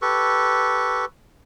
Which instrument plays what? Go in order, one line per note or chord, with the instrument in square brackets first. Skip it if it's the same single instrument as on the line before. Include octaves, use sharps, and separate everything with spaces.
[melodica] G4 A4 B4 C#6